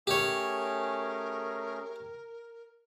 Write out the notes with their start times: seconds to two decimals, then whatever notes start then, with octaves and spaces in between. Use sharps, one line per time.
0.07 A3 C#4 G4 G#4 A#4 C#5